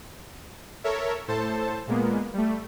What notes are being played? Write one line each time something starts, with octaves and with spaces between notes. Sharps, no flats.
A4 A#4 C#5 E5
A2 A4 C5 A5
A#2 G#3 A#3 B3
G3 A3